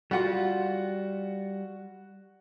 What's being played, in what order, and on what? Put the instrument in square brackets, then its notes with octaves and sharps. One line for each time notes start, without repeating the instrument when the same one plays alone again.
[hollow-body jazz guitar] G3 F4 [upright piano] F#4 F#5